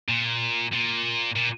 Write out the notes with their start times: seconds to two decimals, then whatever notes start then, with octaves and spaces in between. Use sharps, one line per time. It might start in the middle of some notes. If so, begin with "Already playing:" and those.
0.09 A#2
0.73 A#2
1.36 A#2